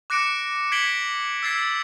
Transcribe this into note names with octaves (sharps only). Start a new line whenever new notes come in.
D6 F#6 A#6 C#7 D7 E7
G#6 B6 C7 D7 F#7 G7
E6 G#6 A6 C7